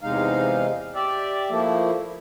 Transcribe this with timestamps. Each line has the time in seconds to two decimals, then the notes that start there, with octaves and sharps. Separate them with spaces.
0.01 E2 C3 G#3 D#4 F5
0.95 G4 D5 E5
1.50 F3 A3 A#3 E4